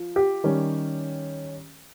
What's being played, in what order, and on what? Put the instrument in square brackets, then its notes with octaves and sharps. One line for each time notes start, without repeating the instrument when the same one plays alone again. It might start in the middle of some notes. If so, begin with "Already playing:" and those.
Already playing: [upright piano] F3
G4
D#3 G3 C#4